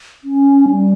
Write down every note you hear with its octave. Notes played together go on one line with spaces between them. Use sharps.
C#4
G3